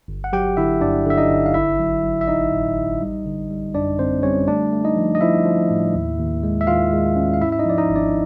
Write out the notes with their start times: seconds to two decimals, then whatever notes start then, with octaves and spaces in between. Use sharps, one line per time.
0.08 G1
0.24 F#5
0.33 F#3 G4 G5
0.57 D3 E4 E5
0.81 G2 D4 D5
1.06 D3 E5
1.18 D#4 D#5
1.30 G1
1.46 F5
1.54 A1 E4 E5
1.79 F#3
2.04 F#3
2.21 E5
2.28 A1 D#4 D#5
2.52 A2
2.76 A1
3.01 G3
3.26 D3
3.51 G3
3.75 F#2 D4 D5
3.99 D3 C4 C5
4.23 G3 C#4 C#5
4.48 A3 D4 D5
4.72 A3
4.84 D#4 D#5
4.96 F3
5.15 D#5
5.21 F3 E4 E5
5.45 F3
5.70 A2
5.95 D#2
6.19 D#2
6.43 G#3
6.61 E5
6.67 D#3 F4 F5
6.92 G#3
7.16 C#4
7.34 F5
7.41 G#2 E4 E5
7.52 E5
7.59 D#4 D#5
7.66 F3 D5
7.78 D#4 D#5
7.90 G#1
7.96 D4 D5